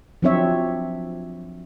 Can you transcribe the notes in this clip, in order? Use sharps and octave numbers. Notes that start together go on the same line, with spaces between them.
F3 F#3 C4 D4 C#5 E5